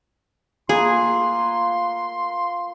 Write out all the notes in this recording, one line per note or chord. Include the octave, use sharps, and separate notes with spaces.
A#3 F4 G#4 B4 C6